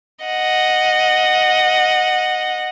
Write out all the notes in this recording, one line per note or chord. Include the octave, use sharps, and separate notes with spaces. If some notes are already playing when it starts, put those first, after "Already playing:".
D#5 F#5